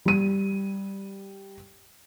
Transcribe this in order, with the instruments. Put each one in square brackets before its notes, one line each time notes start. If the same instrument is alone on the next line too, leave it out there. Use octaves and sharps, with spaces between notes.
[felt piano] G3 D#7